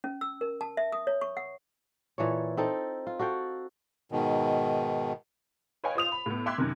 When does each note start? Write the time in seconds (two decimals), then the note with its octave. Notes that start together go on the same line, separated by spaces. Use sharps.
0.04 C#4
0.21 E6
0.41 A#4
0.61 A5
0.77 E5
0.92 D#6
1.07 C#5
1.21 C#6
1.37 F#5
2.18 A#2 E3 A4 C#5
2.57 C4 D#4 A4
3.07 F4
3.19 F#4 A4 F5 G5
4.12 G#2 B2 D#3
5.84 B4 C#5 D#5 F5 G5 G#5
5.95 F4 C5 D#6 F7
6.12 B5
6.26 A2 B3
6.46 E5 G5 C6 D6 F#6 G#6
6.58 F#2 C3 D#3